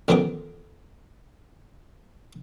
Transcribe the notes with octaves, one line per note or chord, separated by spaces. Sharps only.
A1 F2 D#3 B3 G#4 D6